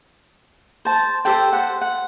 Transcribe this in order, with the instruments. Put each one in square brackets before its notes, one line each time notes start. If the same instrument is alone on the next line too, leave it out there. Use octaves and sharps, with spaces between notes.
[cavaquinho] C5 A5
G4 A4 C5 G5
C5 F#5
F#5